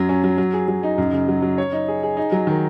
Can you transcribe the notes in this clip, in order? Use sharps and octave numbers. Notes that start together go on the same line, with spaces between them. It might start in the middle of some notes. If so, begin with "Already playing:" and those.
Already playing: F#2 F#3
C#4
F#3
F#3
G#4
F#3
D#4
F#2
C#3
F#3
F#3
C#5
D#4
G#4
G#4
D#4
F#3
D#3